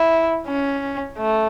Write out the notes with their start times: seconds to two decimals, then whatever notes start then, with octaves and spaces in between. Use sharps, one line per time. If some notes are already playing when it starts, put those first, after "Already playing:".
Already playing: E4
0.47 C#4
1.19 A3